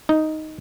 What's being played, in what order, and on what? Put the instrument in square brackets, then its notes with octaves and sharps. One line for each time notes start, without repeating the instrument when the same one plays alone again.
[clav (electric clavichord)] D#4